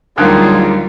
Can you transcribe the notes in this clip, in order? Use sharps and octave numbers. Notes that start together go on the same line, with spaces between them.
D2 D#3 F#3 G3 A#3 F4 G#4